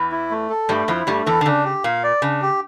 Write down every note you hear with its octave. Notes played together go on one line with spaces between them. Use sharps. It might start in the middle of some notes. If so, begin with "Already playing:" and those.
Already playing: E2 E3
E4
A3
A4
G2 G3 A3
F2 F3 E4
G2 G3 A3
E2 E3 A4
D3
C#3 D4
G4
A#2 F5
D5
C#3 D4
G4